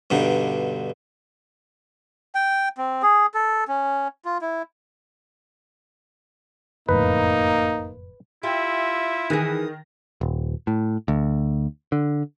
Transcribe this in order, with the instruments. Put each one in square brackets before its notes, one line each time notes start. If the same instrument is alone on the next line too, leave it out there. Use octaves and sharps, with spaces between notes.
[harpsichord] G2 B2 D3 D#4
[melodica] G5
C4
G#4
A4
C#4
F4
E4
[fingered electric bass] F#1 F2 A2 [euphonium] A#3 [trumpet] D#4 [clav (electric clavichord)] B4
[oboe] E4 [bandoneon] F4 E5 [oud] G4
[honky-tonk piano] D#3 A#6 [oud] E3 G#4 [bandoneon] D#6
[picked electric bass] D#1
A2
D2
D3